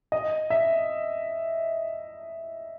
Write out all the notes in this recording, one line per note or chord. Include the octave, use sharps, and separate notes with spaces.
D#5
E5